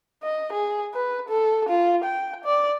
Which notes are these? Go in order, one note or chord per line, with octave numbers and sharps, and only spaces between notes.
D#5
G#4
B4
A4
F4
G5
D5